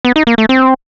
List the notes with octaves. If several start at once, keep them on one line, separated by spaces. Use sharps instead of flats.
B3
D#4
A#3
A3
C4